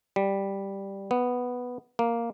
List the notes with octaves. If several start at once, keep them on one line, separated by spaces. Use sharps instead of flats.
G3
B3
A#3